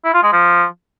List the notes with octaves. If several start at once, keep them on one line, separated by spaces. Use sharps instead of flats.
E4
F4
G#3
F3